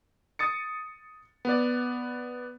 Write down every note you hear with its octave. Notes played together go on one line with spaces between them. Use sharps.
D#6 A6 C#7
B3 D5